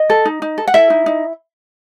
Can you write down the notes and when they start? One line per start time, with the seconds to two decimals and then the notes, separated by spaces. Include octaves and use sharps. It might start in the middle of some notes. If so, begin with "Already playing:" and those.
Already playing: D#5
0.10 A4
0.25 D#4
0.42 D#4
0.58 A4
0.67 F#5
0.74 E4 A4 E5
0.90 D#4
1.06 D#4